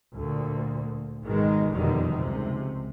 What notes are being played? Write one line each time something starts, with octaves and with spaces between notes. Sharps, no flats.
D2 A#2
G#1 B2 D#3 G#3
F1 F#2 B2 D3 D#3 G3
C#2 C3